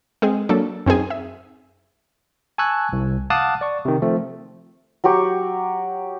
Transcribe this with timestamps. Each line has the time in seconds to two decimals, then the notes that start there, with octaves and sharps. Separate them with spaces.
0.22 G#3 C4 G#4
0.49 F#3 A#3 D4 A4
0.86 F#2 C4 D#4 G#4
1.10 E5
2.58 G#5 A5 C#6 E6 F#6 G#6
2.93 C2
3.30 F5 F#5 A5 D6 D#6 F#6
3.61 D5 C#6
3.85 C3 D#3
4.02 F3 A3 C4
5.04 F#3 F#4 G4 C#6